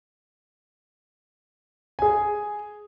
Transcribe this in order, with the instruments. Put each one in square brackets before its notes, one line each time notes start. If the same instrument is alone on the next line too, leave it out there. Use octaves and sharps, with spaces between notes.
[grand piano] G#4 G#5